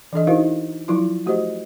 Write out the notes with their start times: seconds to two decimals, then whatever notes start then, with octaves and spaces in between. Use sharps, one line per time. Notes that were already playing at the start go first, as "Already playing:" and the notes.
0.13 E3 D4 A4 D#5
0.27 D#4 E4 F#4 A#4 C5 F5
0.88 F3 F#3 E4 F4 C6
1.26 A3 F#4 G4 C5 D#5